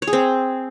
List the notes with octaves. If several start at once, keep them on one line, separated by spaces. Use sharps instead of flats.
C#5
G#4
C4